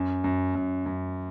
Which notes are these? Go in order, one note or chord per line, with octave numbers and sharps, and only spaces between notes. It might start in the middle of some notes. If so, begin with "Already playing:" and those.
Already playing: F#2
F#2
F#2
F#2